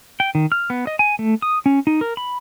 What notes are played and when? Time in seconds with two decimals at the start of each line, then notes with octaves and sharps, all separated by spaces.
0.20 G5
0.35 D#3
0.52 F6
0.70 B3
0.87 D#5
0.99 G#5
1.19 A3
1.42 D#6
1.66 C#4
1.87 D#4
2.01 A#4
2.17 B5